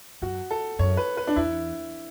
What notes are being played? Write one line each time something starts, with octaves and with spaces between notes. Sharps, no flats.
F#2 F#4
A4
F#2 C#5
B4
B4
D4
E2 E4